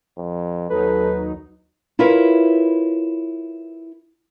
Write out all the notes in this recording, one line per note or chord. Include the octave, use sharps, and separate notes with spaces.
F2
D#2 F#3 D#4 A4 B4
E4 F4 A#4 B4 C#5 E5